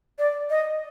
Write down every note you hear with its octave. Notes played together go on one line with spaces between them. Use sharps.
D5
D#5